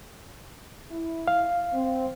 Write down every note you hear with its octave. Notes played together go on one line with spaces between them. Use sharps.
E4
F5
C4